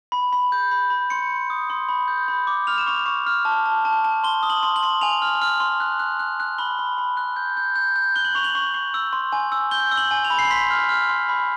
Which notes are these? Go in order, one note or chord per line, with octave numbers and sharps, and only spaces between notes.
B5
B5
G6
B5
B5
C6 C#7
C6
D#6
C6
B5
G6
B5
D6
F6 F7
E7
C#6 F7
C#6
F6
A5
A5
A5
A5
C6 G7
D#6
F#7
C6
F#7
C6
G#5 F7
F6
F6
C6
F#6
F#6
F#6
F#6
B5 G7
B5
B5
F#6
G6
G6
G6
G6
F#6 G7
F#7
C#6 F7
F#7
C#6
C#6
E6
C6
G#5
E6
G6 G7
E6
F#7
G#5
F7
B5
C7
C6 B6
F6
F6
C6
B5